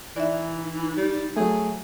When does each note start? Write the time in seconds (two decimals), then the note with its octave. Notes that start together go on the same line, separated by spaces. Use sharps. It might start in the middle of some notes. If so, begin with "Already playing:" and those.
0.16 E3 D#4 D5 E5
0.97 G3
1.37 F#3 A3 G#4